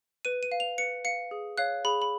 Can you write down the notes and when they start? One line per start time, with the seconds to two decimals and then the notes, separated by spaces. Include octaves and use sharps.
0.25 B4 D#7
0.43 D#7
0.52 F5
0.60 F7
0.78 B4 C#7
1.05 F5 C#7
1.31 G#4
1.58 C#5 F5 F#6
1.85 G#4 B5
2.02 B5